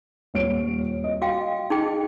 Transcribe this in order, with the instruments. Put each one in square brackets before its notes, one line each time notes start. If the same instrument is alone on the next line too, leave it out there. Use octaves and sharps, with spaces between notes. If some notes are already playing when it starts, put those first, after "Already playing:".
[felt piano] D#1 C#5 D7
D#5
[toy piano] F#4 F5 G5
D#4 G#4 G5